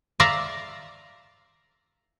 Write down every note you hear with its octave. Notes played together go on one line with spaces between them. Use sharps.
D5 E5 F5 A#5